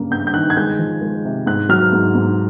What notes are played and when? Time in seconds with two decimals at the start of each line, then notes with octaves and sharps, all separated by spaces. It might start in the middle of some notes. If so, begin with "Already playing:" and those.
Already playing: G2 C#3 A#3
0.11 G2 G6
0.27 G6
0.34 D#3 F#6
0.50 G#6
0.57 G#3 G6
0.79 F3
1.02 G#3
1.25 C3
1.46 G#2 F#6
1.69 F#3 F6
1.93 G#2
2.15 G#2